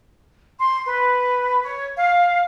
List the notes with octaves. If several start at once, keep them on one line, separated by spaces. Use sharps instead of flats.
C6
B4
C#5
F5